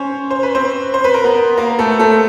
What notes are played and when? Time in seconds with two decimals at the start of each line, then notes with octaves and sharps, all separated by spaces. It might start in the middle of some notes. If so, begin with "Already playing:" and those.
Already playing: C#4 C5 C#5
0.30 C5
0.43 B4
0.55 C4 C5
0.94 C5
1.04 B4
1.14 A#4
1.24 B3 B4
1.57 A#3 A#4
1.79 A3 A4
1.99 A3 A4